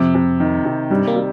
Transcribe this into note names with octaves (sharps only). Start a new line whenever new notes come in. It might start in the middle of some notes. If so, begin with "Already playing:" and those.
Already playing: F2 C3
C3
D#3
C3
G2 G3
A#3
G3